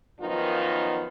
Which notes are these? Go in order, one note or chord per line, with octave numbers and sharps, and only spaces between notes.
F#2 D#3 F3 B3 D#4 F4